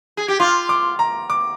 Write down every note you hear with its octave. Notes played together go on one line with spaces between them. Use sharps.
G#4
G4
F4 D6
D6
A#5
D6